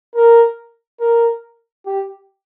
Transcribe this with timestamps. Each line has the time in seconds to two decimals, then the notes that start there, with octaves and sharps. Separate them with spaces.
0.15 A#4
1.00 A#4
1.86 G4